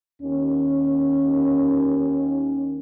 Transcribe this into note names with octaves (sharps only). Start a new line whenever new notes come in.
D#2 C#4